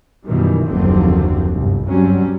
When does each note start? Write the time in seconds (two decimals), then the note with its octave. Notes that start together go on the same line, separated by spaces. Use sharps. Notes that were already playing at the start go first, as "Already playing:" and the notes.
0.25 F#2 B2 D#3 E3 G3
0.66 F#1 D#2 D3 F3 F#3 C4
1.53 G1 C2
1.87 G2 F#3 G3 C4 C#4